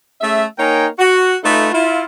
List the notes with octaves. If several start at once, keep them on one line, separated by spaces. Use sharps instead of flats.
A3 C#4 G#4 E5
A#3 D#4 A#4 C#5 G5 G#5
F#4
A3 D#4 F4 A4 B4 E5
E4 F4